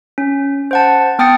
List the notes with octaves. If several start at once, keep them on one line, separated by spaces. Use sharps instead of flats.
C#4
C5 F#5 A5
B3 G5 D#6 A6 C#7